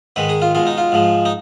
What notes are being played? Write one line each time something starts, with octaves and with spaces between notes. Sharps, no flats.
G#2 D#3 G#3 B4
G#4
F4
B2 G#3 F4
D#4
F4
G#2 F3 G#3
D#4